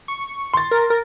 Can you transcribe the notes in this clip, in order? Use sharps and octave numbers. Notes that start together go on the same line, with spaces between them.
C#6
C6 A6
A#4
A#4